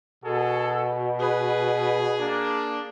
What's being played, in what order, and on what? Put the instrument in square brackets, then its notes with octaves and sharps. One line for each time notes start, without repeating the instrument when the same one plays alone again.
[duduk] B2 [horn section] F#4 G#4 A4
[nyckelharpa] G#4 [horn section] B4
[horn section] A#3 D4